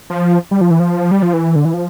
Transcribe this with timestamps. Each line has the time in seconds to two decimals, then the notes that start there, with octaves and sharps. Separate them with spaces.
0.10 F3
0.51 G3
0.61 F3
0.71 E3
0.80 F3
1.11 G3
1.22 F3
1.33 E3
1.56 D3
1.65 E3
1.74 F3